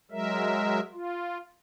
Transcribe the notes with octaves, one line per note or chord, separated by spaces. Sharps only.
F#3 G#3 A#4 E5
F4